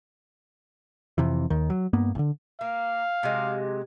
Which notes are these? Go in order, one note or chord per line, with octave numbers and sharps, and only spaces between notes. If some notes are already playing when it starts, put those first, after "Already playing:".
F2 C3 E3
D#2 D#3
F#3
G2 A#3 B3
A1 D3
A#3 F5
C3 F#3 G#3